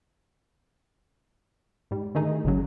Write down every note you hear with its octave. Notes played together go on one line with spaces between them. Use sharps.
G#2 G3
D3 D#3 A3 D#4 G#4
G1 C2 C#3 F#3